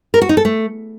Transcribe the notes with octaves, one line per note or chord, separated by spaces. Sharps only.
A#4
F#4
D#4
A4
A3